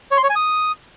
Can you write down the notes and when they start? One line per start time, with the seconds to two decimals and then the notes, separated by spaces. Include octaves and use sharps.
0.11 C#5
0.17 C6
0.24 C#5
0.30 G#5
0.36 D#6